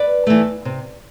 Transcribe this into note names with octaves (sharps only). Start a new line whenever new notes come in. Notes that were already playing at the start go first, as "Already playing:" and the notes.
Already playing: B4 D5
E3 A3
C3